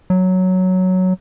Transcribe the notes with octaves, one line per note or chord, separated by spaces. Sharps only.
F#3